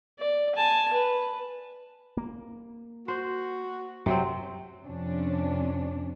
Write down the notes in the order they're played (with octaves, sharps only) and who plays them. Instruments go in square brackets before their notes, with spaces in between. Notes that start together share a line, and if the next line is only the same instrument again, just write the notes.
[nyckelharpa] D5
G#5 A5
B4
[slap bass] A#3
[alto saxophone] F#4 [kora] C5
[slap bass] F#2 [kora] C3 F#3 C4
[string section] F2 C3 C#4 D4